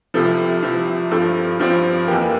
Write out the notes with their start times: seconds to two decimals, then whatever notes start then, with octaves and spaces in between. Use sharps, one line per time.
0.14 C2 C3 F3 A4
0.62 C2 C3 F3
1.11 G2 F3 C4 A4
1.59 G2 F3 C4
2.08 F2 E3 A#3 G4